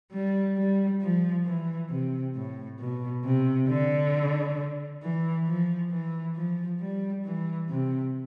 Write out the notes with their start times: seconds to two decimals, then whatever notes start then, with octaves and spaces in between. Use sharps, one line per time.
0.12 G3
0.57 G3
1.01 F3
1.45 E3
1.90 C3
2.35 A2
2.79 B2
3.24 C3
3.68 D3
5.02 E3
5.47 F3
5.91 E3
6.35 F3
6.80 G3
7.24 E3
7.69 C3